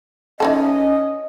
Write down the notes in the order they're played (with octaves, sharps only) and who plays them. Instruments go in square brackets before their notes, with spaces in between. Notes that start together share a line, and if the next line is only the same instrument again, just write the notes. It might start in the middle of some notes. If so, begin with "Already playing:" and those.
[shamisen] E3 D#4 A4 [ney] C#4 [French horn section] D#5